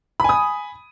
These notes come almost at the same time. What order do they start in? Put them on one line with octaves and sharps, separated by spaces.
B5 G#5 D#6